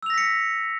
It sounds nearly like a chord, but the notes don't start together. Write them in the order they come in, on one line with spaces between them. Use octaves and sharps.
E6 F7 A#6 B6 C#7